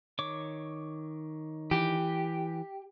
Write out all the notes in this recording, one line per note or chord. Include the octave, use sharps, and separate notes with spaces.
D#3 C#5 D6
E3 G4